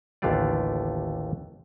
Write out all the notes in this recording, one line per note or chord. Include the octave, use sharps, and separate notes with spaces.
A1 D#2 D3 A3 F4 D5